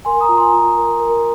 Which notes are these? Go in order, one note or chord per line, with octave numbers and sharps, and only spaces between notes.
A#4 G#5 C6
A#5 D#6
F4
G#5 C6
F4 A#5
A#4
A#4